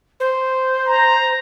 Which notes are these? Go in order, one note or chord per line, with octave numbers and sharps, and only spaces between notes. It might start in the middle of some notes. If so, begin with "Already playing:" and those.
C5
A#5